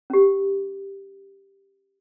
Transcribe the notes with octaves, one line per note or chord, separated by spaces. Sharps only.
C#4 G4